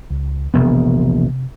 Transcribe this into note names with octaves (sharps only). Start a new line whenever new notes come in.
C#2
E1 A#1 C3 B3